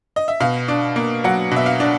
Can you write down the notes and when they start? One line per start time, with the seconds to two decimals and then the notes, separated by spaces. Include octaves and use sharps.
0.16 D#5
0.28 E5
0.40 B2 F5
0.68 D4
0.96 A#3
1.24 F#3 F#5
1.51 B2 E5
1.66 F5
1.80 D4